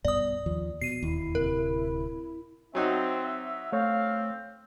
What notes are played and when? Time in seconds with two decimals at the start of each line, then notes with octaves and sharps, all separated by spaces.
0.05 B1 G2 B2 D5 D#6
0.46 D#2 F3
0.81 B2 C7 D#7
1.03 E1 D#2 E4
1.35 D1 C3 A#4
2.75 F#3 C4 D#4 F#4 E5
3.72 A3 C4 C#5 F5